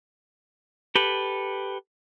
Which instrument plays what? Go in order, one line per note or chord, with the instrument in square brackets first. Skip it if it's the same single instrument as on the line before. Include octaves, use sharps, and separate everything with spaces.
[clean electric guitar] G4 A4 B4